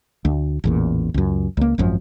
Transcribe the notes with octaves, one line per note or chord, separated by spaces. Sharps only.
D2
A1 E2 A#2
C#2 F#2
C#2 A#3
G#1 F#2 F3